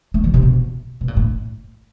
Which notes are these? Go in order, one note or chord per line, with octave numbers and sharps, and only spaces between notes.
A3
E3
C3
B2
B2
A#2
A2